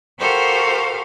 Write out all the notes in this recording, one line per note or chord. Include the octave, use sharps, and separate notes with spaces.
F#4 G4 A4 A#4 C5 F5